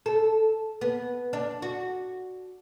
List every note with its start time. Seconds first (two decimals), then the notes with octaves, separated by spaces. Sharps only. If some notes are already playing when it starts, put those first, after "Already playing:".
0.06 A4
0.81 B3
1.33 D4
1.62 F#4